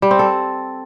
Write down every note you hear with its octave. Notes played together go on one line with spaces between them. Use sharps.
G3
C4
A4